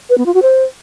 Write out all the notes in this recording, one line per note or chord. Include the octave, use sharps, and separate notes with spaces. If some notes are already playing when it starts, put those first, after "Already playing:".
B4
B3
F4
F#4
C5